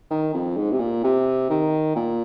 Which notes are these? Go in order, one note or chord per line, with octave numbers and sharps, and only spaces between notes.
D#3
F2
G#2
C3
A#2
C3
D#3
A#2